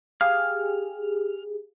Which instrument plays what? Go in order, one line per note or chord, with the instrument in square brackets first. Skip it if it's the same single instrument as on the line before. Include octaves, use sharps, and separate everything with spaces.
[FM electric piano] G4 G#4 [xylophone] F5 [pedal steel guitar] F6